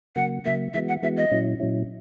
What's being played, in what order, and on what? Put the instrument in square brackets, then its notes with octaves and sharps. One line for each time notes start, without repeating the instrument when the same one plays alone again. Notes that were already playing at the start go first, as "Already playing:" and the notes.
[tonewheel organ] C#3 F#3 A#3 [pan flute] F#5
[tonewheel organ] C#3 F#3 A#3 [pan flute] E5
[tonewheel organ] E3 G#3 B3 F#4 [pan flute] E5
[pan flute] F#5
[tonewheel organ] E3 G#3 B3 F#4 [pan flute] E5
[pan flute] D#5
[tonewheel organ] A#2 F#3 C#4 E4
A#2 F#3 C#4 E4